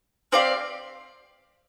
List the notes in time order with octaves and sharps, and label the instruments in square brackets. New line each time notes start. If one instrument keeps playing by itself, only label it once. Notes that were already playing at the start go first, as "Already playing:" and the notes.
[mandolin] C4 G4 D5 F5